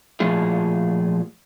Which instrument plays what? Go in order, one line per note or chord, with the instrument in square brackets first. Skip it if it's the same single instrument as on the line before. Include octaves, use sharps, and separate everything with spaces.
[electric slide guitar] A#2 F3 A3 F4 G#4